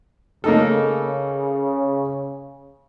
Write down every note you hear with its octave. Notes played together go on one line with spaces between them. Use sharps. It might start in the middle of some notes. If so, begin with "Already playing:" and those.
C#3 A#3 D#4 A4